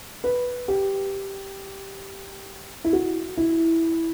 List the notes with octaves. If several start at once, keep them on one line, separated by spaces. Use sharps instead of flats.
B4
G4
E4
F#4
E4